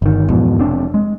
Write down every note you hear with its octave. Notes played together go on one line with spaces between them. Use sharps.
G1 D#3
F2 G#2 B2 E3
F1 C4 D4
G#3